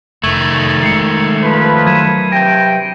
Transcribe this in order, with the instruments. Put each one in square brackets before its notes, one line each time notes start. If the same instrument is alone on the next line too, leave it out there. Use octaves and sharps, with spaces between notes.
[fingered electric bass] F1 [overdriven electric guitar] D#3 A3 [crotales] C#6 G#6 F#7
[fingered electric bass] G#3 [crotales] C7 C#7
[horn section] F3 B4
[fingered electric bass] F#3 [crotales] G#6 D#7 E7
[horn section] G2 C3 G5 [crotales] G#6 A#6 D7